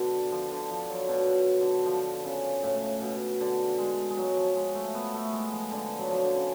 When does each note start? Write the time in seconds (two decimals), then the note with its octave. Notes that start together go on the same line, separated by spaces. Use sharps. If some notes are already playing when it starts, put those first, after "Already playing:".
Already playing: B2 D3
0.32 F3
0.51 D3
0.70 F3
0.89 F#3
1.08 B2
1.61 D3
1.86 F3
2.24 C#3
2.63 A2
3.01 B2
3.41 D3
3.78 G#3
4.11 G#3
4.17 F#3
4.37 F3
4.55 G#3
4.75 A3
4.95 B3
5.14 A3
5.33 G#3
5.52 F3
5.72 D3
5.99 F#3
6.11 F3
6.23 D3
6.36 C#3